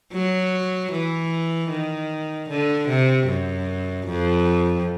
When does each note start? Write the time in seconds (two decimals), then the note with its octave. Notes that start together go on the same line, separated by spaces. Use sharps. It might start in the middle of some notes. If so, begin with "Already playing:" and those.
0.13 F#3
0.92 E3
1.71 D#3
2.49 D3
2.89 C3
3.28 F#2
4.07 F2